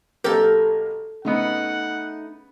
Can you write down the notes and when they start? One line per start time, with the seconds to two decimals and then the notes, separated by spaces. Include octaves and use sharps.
0.24 B1 A#3 G4 A4 A#4
1.25 C#3 A3 B3 D#4 F#5